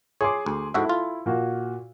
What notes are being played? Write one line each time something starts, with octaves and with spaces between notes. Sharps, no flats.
G#4 C#5 C6 D6
D2
G#2 E4 F#4 A4 E5
F4
A#2 A#3 F#4